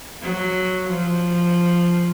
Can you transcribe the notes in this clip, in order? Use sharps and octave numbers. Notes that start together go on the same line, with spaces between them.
F#3
F3